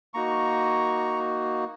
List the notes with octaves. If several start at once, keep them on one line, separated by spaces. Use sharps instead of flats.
A#3 D#4 F#4 A#5 C#6